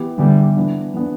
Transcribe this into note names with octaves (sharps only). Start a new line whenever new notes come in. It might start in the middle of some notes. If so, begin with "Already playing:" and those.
Already playing: E3 B3 E4 G4
D3 E3 G3 B3 E4 G4
E3 B3 D4
E3 B3 D4